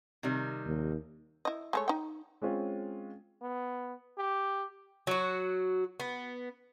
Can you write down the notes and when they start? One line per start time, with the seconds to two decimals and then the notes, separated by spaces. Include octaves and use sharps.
0.23 C3 D#3 G3
0.66 D#2
1.45 E4 D#5
1.73 G#3 A3 C#5
1.88 D#4 G5
2.42 G#3 C4 C#4 F4
3.42 B3
4.18 G4
5.07 F#3 F#4
6.00 B3